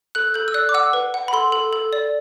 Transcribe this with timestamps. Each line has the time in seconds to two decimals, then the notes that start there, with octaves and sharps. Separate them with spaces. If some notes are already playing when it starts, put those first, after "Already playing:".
0.15 A4 F#6
0.34 A4 G6
0.48 E6
0.54 D5 F#6
0.69 D6
0.74 F#5 E6
0.93 B4
1.14 F#5
1.28 B5
1.33 A4 C6
1.52 A4
1.73 A4
1.93 D5